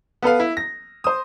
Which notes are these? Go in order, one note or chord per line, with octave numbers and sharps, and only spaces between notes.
B3 A4 B4 F5
E4
A#6
C5 D#6